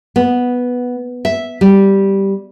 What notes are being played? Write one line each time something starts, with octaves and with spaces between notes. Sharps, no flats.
B3
E5
G3